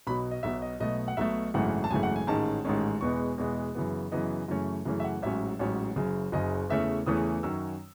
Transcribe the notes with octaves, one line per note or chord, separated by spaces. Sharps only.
B1 B2 F#3 B5
D#5
B1 B2 F#3 E5
D#5
B1 B2 A3 D#5
F#5
B1 B2 A3 E5
G#1 F#2 C#3 E3 A3 F#5
A5
G#1 F#2 C#3 E3 A3 G#5
F#5
G#5
A1 G#2 D#3 G#3 C#4 A5
A1 G#2 D#3 G#3 C#4
E2 B2 G#3 B3 C#6
E2 B2 G#3 B3
F#2 C#3 E3 B3
F#2 C#3 E3 B3 D#5
F#2 C#3 E3 A3 C#4
F#2 C#3 E3 A3 C#4
E5
F#5
A1 G#2 F#3 C#4 E5
A1 G#2 F#3 C#4
F#1 F#2 C#3
F#1 F#2 C#3 D#5
E2 C#3 E3 A3 C#4 E5
E2 C#3 E3 A3 C#4 D#6
F#2 D#3 F#3 C#4 E6